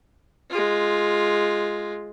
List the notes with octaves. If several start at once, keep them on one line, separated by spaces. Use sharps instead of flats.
G#3 F4